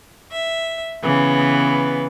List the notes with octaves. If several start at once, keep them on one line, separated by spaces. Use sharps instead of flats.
E5
C#3 E3 B3